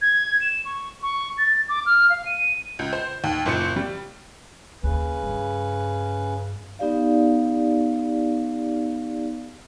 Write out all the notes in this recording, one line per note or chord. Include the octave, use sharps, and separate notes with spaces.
G#6
E7
C#6
C#6
A6
D6
F6
F5
D#7
C#2
C5
D#2
F#1 A#2 C5 C#7
G3
D#2 C#3 C#4 B4
G2
B3 D#4 G4 D5 F5